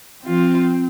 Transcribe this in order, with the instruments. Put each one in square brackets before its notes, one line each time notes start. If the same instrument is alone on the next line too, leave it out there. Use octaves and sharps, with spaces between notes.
[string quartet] F3 F4 [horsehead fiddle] C4